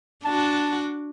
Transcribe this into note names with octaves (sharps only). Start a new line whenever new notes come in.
D4 F#4 A5